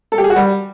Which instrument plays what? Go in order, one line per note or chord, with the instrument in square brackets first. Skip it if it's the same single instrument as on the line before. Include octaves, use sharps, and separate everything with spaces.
[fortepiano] A4
G4
G#4
F#4
G3